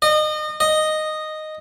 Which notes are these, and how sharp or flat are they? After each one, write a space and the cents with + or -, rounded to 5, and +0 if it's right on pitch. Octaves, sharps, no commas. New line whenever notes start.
D#5 -30
D#5 -5